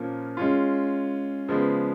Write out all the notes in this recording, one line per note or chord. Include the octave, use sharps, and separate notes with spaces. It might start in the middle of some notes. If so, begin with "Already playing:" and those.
Already playing: A#2 F3 A#3 C#4
G#3 C#4 F4
C#3 F3 G#3 B3